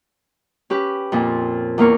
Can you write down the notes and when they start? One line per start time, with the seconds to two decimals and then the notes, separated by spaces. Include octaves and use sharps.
0.70 C#4 G4 B4
1.12 F2 A#2
1.78 E2 A#3 A#4 C#6